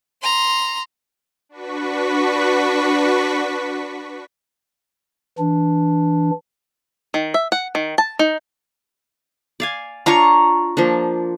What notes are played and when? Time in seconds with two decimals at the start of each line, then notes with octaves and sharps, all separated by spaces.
0.22 A#5 C6
1.49 D4 F#4 B4 C#6 B6
5.39 E3 D4
7.14 D#3
7.34 E5
7.52 F#5
7.75 D#3
7.98 A5
8.19 D#4
9.60 D5 F5 G#5
10.06 D4 F4 C#5 A#5 C#6
10.77 F3 A#3 D4